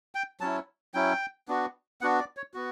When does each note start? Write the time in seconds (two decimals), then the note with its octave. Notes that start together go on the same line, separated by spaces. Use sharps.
0.15 G5
0.41 F#3 C#4 E4 A5
0.94 F#3 C#4 E4 G5
1.48 B3 D4 F#4
2.01 B3 D4 F#4 F#5
2.19 D5
2.37 C#5
2.54 B3 F#4